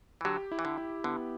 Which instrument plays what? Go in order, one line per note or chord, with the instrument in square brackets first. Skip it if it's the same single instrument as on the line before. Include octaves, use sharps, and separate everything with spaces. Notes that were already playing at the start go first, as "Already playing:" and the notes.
[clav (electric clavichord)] E3
[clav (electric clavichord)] D3 F#3 [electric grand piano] G4
[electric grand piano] E4
[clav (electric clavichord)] E3
D3
[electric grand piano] E4
[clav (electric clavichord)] D3 [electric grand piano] B3